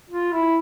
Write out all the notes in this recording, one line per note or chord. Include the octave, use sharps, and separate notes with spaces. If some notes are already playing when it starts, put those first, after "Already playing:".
F4
E4